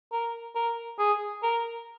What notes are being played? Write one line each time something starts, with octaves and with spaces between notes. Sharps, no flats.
A#4
A#4
G#4
A#4